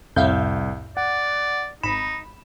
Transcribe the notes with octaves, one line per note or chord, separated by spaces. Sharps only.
C2 F2 A2 E5 F5 G6
D5 F#5
G#1 D#4 B5 E7